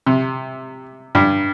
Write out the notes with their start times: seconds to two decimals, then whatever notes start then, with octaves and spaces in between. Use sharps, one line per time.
0.06 C3
1.15 G2